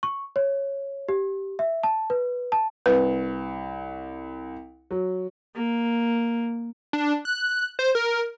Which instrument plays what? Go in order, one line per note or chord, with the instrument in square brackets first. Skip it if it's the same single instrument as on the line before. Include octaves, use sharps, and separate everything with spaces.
[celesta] C#6
C#5
G4
E5
A5
B4
A5
[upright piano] C2 [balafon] B4
[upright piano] F#3
[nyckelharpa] A#3
[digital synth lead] D4
F#6
C5
A#4